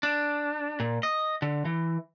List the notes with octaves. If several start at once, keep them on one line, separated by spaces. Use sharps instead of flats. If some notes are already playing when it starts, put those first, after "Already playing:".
D4
A#2
D#5
D3
E3